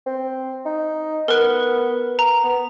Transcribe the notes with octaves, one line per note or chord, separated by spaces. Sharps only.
C4
D#4
B3 A#4 B4
A#5
B3